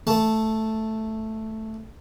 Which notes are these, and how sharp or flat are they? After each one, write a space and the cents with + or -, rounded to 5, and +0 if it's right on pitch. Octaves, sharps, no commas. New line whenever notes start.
A3 +0 A5 +0